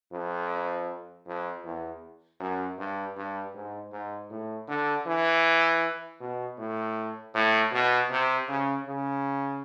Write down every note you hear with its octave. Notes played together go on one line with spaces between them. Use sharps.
F2
F2
E2
F#2
G2
G2
G#2
G#2
A2
D3
E3
B2
A2
A2
B2
C3
C#3
C#3